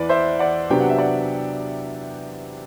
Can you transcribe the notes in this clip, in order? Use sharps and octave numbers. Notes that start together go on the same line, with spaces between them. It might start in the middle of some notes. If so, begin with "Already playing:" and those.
Already playing: E2 E3 B4 D5
C5 E5
D5 F#5
C3 F#3 B3 D4 G4 G5
F#5
E5
D5 F#5